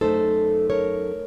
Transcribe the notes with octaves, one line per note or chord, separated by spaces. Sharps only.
F#2 C#3 A3 D#4 A4 C5
A#4 C#5